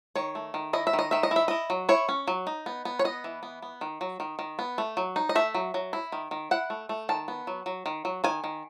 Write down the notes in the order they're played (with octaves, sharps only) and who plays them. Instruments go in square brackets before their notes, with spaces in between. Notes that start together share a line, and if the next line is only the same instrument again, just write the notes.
[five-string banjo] D#3 C#5
A3
D#3
E4 D#5
E5
D#3
D#5
D#3 E5
D#5
E4 E5
E4 D#5
F#3
E4 C#5
C#4
F#3
D#4
B3
B3
C#5
B3 D#5
E3
B3
B3
D#3
F#3
D#3
D#3
B3
A3
F#3
D#4
D#5
A3 E5
F#3
F#3
E4
D#3
D#3
E4 F#5
A3
A3
D#3 A5
B3
F#3
F#3
D#3
F#3
D#3 G#5
D#3